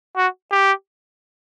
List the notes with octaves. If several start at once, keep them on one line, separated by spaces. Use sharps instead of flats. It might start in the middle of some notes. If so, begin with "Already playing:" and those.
F#4
G4